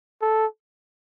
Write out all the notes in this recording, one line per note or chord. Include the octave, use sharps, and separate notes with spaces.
A4